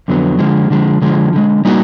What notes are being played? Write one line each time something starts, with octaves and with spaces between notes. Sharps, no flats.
F2 D3 F#3 B3
D3 F3 G#3
D3 F3 G#3
D3 F3 G#3
D3 F3 G#3
G3 A#3 D#4 F#4